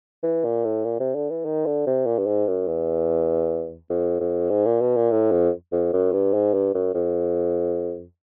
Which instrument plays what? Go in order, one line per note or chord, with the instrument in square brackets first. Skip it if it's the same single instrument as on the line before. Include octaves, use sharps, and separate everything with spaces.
[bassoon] E3
A#2
A2
A#2
C3
D3
E3
D#3
D3
C3
A#2
G2
G#2
F#2
E2
F2
F2
G#2
A#2
B2
A#2
A2
F2
F2
F#2
G2
G#2
G2
F#2
F2